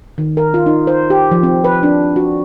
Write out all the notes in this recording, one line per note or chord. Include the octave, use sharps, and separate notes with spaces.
D#3
A#4
F4
D#4
C5
G4
F3
C4
B4
D4
F#4